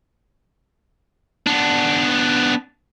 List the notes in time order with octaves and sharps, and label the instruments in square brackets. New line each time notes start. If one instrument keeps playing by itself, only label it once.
[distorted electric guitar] B3 D4